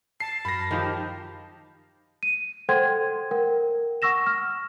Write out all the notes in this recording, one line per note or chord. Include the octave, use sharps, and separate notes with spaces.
A5 C7
F#2 B5 F6 A#6
D#3 F3 G4 G#4 F5 D#6
D#7
A4 C5 F#5 G5 C6 G#6
A#4 F#5 G5
F#5 C#6 E6 A#6 E7
F6